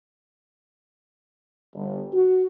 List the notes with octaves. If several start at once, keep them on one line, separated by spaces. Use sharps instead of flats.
G1
F#4